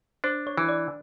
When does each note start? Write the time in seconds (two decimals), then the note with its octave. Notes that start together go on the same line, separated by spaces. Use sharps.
0.24 D4 C5
0.47 C#5
0.57 E3
0.69 D5